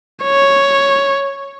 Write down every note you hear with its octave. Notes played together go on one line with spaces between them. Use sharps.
C#5